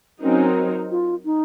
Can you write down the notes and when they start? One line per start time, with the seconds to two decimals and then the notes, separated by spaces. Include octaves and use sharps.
0.22 F#3 C4 C#4 D#4 A#4
0.91 F4
1.25 D#4